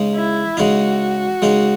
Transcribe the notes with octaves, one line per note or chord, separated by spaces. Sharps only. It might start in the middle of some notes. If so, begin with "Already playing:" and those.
Already playing: C#3 G#3 D#4
E4
C#3 G#3 D#4 F#4
C#3 G#3 D#4